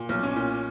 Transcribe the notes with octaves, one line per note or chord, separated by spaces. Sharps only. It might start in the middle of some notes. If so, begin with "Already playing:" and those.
Already playing: A#2
B1
C#4
A#2